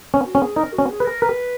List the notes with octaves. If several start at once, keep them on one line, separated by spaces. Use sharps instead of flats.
C#4
F#4
C#4
G#4
D#4 A#4
F#4
C#4
G#4
B4
A#4
A#4 B4